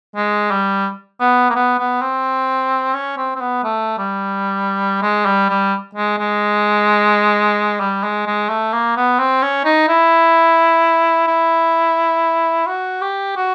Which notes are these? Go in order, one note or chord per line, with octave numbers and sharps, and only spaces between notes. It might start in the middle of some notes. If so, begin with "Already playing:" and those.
G#3
G3
B3
A#3
B3
B3
C4
C#4
C4
C4
B3
A3
G3
G#3
G3
G3
G#3
G#3
G3
G#3
G#3
A3
A#3
B3
C4
C#4
D#4
E4
E4
F#4
G4
F#4